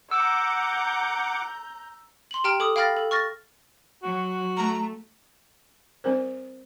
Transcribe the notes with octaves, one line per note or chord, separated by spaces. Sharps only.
F#5 A#5 D6 E6 G6
C6 F#7
G4 G5 A#5 F6 D7
A4 D6 D#6
F5 G5 B5 F6 A6 A#6
A4
C#6 F6 A6 A#6
F#3 F#4
A3 A#5
G3 C4 A#4 C5